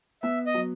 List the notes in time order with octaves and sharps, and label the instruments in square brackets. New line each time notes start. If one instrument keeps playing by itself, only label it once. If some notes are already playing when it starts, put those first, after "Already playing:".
[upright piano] B3 [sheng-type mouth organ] E5
[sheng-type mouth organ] D#5
[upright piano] F#3